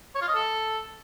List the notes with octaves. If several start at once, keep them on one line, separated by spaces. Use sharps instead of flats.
C#5
F4
D#5
A4